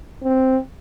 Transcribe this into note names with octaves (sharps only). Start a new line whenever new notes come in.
C4